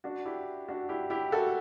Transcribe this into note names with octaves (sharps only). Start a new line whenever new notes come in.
D4 F#4
E4 G4
D4 F#4
E4 G4
E4 G4
F#4 A4